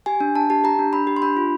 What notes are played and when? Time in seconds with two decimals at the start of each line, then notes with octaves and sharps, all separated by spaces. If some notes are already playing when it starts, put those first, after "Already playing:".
0.06 G4 G#5
0.21 D4
0.35 D4 A5
0.50 G4 A5
0.64 G4 A#5
0.79 D4
0.93 D4 B5
1.07 G4
1.16 C6
1.22 D4 B5
1.37 F4